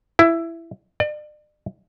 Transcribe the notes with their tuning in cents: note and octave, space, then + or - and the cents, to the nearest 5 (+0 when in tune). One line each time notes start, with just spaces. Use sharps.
E4 +15
D5 +40